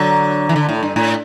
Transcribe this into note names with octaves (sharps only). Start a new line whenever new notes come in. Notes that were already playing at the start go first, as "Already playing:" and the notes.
Already playing: D3 F#3
E3
D3
A2
G2
A2